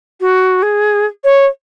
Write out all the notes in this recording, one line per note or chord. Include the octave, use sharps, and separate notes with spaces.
F#4
G#4
C#5